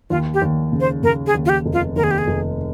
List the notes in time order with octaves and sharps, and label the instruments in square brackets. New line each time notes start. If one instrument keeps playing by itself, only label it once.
[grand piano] D#2 [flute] F4
[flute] G4
[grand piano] D#2
C#3
[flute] C5
[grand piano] C#3 [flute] A#4
[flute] G#4
[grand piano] D#2
[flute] F4
G4
[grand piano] F1
[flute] F4
[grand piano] D#2 [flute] A#4
[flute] G#4
G4
G#4
[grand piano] F1